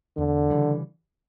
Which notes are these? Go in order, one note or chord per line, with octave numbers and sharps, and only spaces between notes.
E2 D3
C#3 E3 G3